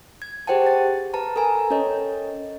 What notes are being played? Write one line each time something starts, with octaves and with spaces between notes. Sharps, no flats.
G#6
G4 G#4 C5 F#5 G5 A5
A6
B4 A5 A#5
A4 A#4 G#5 A#5
C#4 A4 C#5 D#5